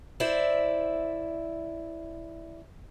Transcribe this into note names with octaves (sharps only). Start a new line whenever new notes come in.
E4 C5 D5 E5